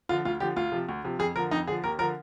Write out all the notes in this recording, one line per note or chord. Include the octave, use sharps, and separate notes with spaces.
D3 F3 F4
D2 F4
D3 F3 G4
D2 F4
C3 F3
D2
C3 F3
F2 G#4
D3 F3 A#4
F2 D#4
D3 F3 G#4
D#2 A#4
D3 F3 A#4